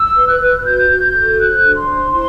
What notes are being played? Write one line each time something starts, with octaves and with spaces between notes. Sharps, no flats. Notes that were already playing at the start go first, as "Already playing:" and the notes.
Already playing: E6
B4
F#6
B4
F#6
F#4 G6
F#4
A4
C5 F#6
D4
C6
C5
E4 C6